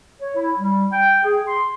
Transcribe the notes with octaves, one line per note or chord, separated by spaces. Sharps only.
C#5
E4
G3
G5
G#4
C6